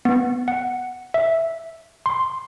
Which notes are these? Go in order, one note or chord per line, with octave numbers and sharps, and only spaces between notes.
B3
F#5
E5
C6